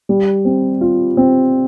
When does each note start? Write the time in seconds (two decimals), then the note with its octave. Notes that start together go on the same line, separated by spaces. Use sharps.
0.09 G3
0.45 C4
0.81 F4
1.17 C4